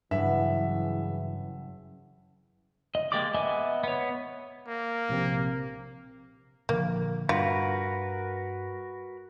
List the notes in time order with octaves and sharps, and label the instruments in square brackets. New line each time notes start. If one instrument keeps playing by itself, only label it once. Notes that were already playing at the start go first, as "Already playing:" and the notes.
[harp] F#1 B4 [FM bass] G2 [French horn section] C#3 E3 [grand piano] E5
[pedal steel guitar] D#5
G#3 A#3 G4 D5 D6
B3 D#5 E5 G#5
B3 C#5
[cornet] A#3
[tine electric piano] A#1 C3 C4
[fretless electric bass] A#2 D3 F3 [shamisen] A#3
[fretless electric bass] G2 [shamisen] F4 [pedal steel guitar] F#4 A#4 B4